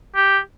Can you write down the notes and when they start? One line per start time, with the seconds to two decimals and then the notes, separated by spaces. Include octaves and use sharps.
0.16 G4